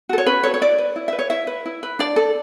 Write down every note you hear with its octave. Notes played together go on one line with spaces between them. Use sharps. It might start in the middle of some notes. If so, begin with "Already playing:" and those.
F#4 A4
C#5
C#4 B4
F#4 A4 C#5
C#5
E4 D5
B4
E4
B4 E5
C#5
E4 E5
B4
E4
B4
D4 D5
A4